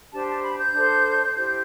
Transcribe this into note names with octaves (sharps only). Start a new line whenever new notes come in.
D4 G4 C5 A5
A5
B5
G6
D4 A4 C5
E4 G4 C5 G6